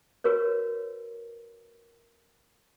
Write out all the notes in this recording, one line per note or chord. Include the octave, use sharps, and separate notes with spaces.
F#4 A#4 B4 C#5